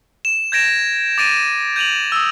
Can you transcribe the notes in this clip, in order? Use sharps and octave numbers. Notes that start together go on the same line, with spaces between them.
E7
G6 G#6 A#6 D7 E7
D6 A6 D7 D#7
G6 D#7 F7 F#7
D#6 E6